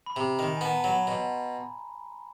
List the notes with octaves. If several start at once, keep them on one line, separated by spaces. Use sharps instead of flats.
B5
C3 A#5
D#3
G#5
B3 A5
A#5
A5
F#3
B5
B2 C6